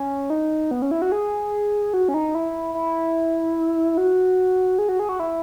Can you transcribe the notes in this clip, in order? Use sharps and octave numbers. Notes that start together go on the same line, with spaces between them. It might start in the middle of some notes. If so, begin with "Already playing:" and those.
Already playing: C#4
D#4
B3
C#4
E4
F#4
G#4
F#4
C#4
D#4
E4
E4
F#4
G#4
F#4
G#4
F#4
E4